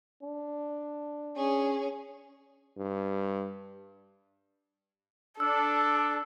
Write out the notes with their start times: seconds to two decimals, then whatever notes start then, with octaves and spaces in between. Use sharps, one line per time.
0.22 D4
1.35 C#4 G#4
2.77 G2
5.40 D4 A4 E6